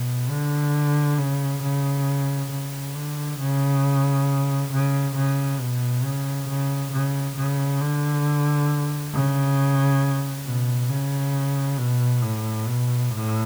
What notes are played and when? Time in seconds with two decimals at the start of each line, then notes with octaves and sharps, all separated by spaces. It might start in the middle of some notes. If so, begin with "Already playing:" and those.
Already playing: B2
0.30 D3
1.18 C#3
1.63 C#3
2.50 C#3
2.95 D3
3.39 C#3
4.72 C#3
5.16 C#3
5.60 B2
6.04 C#3
6.48 C#3
6.92 C#3
7.36 C#3
7.81 D3
9.13 C#3
10.45 B2
10.89 C#3
11.77 B2
12.22 A2
12.66 B2
13.10 A2